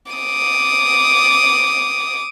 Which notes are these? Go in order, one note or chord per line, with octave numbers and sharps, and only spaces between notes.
D6 D#6